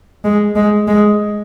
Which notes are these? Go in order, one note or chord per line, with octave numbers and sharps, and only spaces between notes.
G#3
G#3
G#3